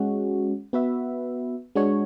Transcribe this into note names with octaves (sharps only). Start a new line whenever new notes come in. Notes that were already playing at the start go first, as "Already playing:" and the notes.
Already playing: G#3 C#4 F#4
B3 F#4 B4 E5
G#3 D4 F#4 C#5